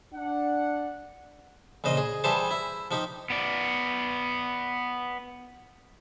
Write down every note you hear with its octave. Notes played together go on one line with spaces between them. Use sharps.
D4 F#5
A#1 C#3 C5 D#5
G#4
E3 G3 G4 G#4 C5 A5
E4
F3 D#4 G4
B3 D5